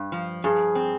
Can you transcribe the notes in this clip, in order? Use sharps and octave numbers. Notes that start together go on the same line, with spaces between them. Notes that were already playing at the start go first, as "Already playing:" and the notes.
Already playing: G2
F3
G2 G#4
C4